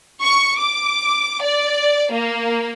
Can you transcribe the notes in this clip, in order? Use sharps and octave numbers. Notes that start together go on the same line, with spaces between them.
C#6
D6
D5
A#3